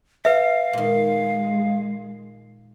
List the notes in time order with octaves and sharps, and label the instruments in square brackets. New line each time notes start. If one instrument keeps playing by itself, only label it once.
[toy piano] B4 E5 [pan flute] F5
[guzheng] A#2 D#3 [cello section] G#3